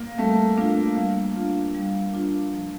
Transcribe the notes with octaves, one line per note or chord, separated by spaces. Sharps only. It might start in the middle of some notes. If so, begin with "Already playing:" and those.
Already playing: A#3
G3 A3
A#3 D4 F4
G3 A#3
D4 F4
G3
D4 F4
F3